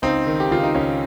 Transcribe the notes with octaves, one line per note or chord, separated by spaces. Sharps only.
C#2 C4 D#4
D#3
G4
C#2 F4
D#4
C#2 C#4